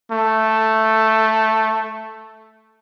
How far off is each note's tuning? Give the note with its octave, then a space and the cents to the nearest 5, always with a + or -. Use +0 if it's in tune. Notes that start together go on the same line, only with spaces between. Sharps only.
A3 +0